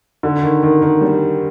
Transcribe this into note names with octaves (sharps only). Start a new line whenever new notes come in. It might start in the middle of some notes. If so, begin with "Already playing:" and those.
D3
D#3
D#3
D#3
G3